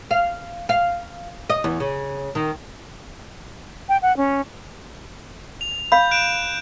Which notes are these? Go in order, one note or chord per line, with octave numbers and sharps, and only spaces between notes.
F5
F5
D#5
E2
C#3
D#3
G5
F#5
C#4
F7
F5 B5 G6
F#6 D7 E7